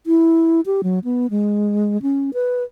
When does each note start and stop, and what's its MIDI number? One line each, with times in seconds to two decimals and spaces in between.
0.06 0.61 64
0.66 0.81 67
0.83 0.99 54
1.04 1.27 59
1.30 2.01 56
2.02 2.30 61
2.34 2.63 71